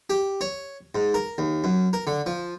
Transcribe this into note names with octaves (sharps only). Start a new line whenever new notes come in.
G4
C#5
G#2
A#4
D#2
F#2
A#4
D3
F3